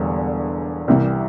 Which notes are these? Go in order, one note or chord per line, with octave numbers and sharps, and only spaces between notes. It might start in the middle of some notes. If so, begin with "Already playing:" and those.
Already playing: E1 E2 D3 G3
C2 C3 E3 G3